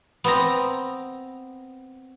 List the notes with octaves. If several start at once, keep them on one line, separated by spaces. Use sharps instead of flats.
B3 C4 A#5